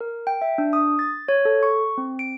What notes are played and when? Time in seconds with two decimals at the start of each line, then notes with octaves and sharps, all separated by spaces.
0.01 A#4
0.27 G5
0.42 E5
0.58 D4
0.73 D#6
0.99 A6
1.28 C#5
1.45 A4
1.63 C#6
1.98 C4
2.19 D7